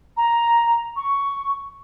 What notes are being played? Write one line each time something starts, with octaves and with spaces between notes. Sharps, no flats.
A#5
C#6